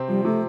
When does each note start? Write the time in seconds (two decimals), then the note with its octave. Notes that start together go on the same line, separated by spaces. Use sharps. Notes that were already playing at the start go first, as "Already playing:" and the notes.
Already playing: C3 C4
0.08 F3 G3
0.25 C3 A3